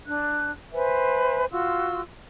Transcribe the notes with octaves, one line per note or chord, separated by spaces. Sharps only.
D4 F#6
B4 C5 E5 G#5
F4 F#4 C6 E6